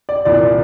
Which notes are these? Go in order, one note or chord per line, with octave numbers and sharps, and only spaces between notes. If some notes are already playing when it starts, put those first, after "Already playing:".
D5
C2 A#2 D5